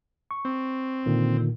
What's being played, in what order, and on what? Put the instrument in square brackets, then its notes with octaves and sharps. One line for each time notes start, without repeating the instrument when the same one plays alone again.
[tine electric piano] C#6
[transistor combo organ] C4
[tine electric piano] A#2 D3 D#3